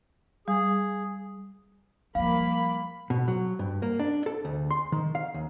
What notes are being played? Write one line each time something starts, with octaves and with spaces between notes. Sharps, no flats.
G3 G#4
F3 G3 A#3 F5 B5
B2
F#3
G2
A#3
D4
A4
D2
C6
D#3
F5
D#2